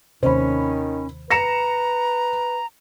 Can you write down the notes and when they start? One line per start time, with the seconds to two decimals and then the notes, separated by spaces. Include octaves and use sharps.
0.23 D#2 C3 D#3 C#4 C5 B5
1.31 B4 A#5 A#6 C#7 E7